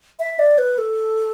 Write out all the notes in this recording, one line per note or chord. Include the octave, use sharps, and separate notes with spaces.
E5
D5
B4
A4